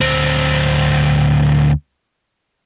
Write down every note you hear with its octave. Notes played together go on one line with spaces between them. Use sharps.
D2 C4